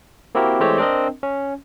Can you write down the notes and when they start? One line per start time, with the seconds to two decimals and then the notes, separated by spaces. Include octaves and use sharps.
0.35 A#3 C4 E4 F#4 G4 A#4
0.60 E3 G#3 A3 C4 G4 C#5
0.78 C4 D4 A#4 D#5
1.23 C#4